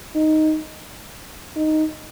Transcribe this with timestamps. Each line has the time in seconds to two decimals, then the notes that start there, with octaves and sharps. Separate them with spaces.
0.15 D#4
1.56 D#4